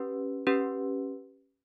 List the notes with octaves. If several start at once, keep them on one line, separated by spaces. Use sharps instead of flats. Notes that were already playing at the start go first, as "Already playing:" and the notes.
Already playing: C#4 G4 B4
C#4 G4 B4